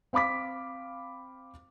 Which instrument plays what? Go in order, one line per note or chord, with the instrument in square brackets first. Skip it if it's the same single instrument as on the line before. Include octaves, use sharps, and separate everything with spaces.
[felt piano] C4 F5 B5 D6 B6